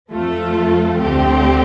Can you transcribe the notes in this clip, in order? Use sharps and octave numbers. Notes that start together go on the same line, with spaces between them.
F2 F3 A3 F4 A4
D2 D3 A3 C4 G4